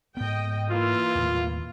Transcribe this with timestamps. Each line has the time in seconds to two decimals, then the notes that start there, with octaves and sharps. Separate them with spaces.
0.17 G#2 B3 D#5 G5
0.69 E3 A#3 F4
1.15 D#2 A2